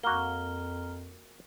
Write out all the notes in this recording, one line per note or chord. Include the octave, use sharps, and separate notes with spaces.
F2 A#3 F#4 A#5 F6 G7